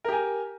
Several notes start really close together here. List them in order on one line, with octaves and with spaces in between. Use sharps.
A#4 G4 G#5